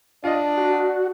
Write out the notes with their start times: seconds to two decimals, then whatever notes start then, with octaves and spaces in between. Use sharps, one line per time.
0.24 D4 F4 D5 D#5
0.58 F#4